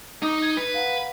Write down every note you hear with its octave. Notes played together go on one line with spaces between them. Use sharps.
D#4 D6 D#6
G#6
B4
F5 F#5 A#5